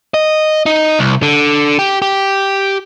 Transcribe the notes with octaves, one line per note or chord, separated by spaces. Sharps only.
D#5
D#4
C2
D3
G4
G4